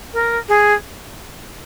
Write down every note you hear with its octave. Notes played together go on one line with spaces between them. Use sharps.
A#4
G#4